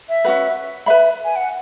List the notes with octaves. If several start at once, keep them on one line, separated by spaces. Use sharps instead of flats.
E5
C#4 F#4 B4
B4 E5 B5
G#5
F#5